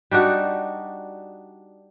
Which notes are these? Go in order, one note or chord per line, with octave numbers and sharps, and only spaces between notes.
G3 D4 D#4 F#4